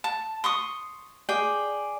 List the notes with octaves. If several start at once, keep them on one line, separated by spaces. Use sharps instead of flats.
A5
C6 C#6 D#6
G#4 D5 G5